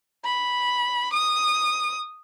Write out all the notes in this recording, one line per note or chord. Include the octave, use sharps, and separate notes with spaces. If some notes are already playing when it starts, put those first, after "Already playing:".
B5
D#6